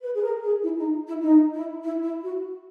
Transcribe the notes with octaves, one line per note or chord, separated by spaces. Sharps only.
B4
G#4
A#4
G#4
E4
D#4
E4
D#4
E4
E4
E4
F#4